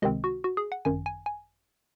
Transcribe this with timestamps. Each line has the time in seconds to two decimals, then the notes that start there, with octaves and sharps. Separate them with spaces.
0.02 C#2 C3 D#3 G#3 C4 D#5
0.24 F#4
0.44 F#4
0.57 G#4
0.72 F#5
0.85 G#1 F#2 D#3 G#5
1.06 G#5
1.26 G#5